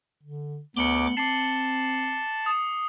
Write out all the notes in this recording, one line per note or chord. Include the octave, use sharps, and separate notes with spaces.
D3
D2 B3 D6 C#7 F#7 G7
C4 A5 D6 C7
D#6